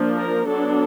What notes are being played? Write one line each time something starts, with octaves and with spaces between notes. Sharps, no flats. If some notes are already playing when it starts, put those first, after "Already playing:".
Already playing: F3 A#3 D4
A#4
F#3 B3 D4 A4